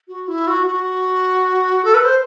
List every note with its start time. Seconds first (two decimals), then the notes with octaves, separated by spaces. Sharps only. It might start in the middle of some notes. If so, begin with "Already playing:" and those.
0.08 F#4
0.28 E4
0.47 F#4
0.67 F#4
1.85 A4
1.94 B4
2.04 C5